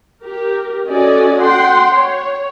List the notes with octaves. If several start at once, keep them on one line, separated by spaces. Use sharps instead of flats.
G4 A#4
C#4 F#4 A4 D5 D#5 G#5
F#5 G5 C6
C#5